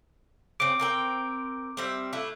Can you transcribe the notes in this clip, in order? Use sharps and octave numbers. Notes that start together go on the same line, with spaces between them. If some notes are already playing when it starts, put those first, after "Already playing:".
C#3 C4 D6
C4 A#4 G5
G3 C4 E5
A3 D4 E4